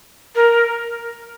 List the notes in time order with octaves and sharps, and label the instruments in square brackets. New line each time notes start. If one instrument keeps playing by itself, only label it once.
[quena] A#4